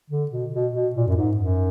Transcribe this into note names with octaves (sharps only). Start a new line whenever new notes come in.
D3
B2
B2
B2
A#2
F#2
G#2
F#2